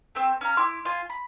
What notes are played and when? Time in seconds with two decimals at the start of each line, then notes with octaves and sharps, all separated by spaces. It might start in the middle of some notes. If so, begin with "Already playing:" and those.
0.15 A3 C4
0.41 C#4 F5 A#5
0.57 E4 C6 D6
0.85 F4 G#5
1.10 B5